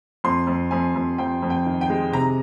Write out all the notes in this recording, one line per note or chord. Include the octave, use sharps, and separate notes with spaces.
F2 C6
F2
F2 G#5
F2
F2 G5
F2
G5
D#3
G5
G#3
C3 A#5